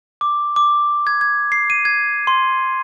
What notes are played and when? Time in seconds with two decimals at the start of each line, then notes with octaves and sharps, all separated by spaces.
0.21 D6
0.56 D6
1.07 G#6
1.21 G#6
1.52 C7
1.70 D#7
1.85 G#6
2.27 C6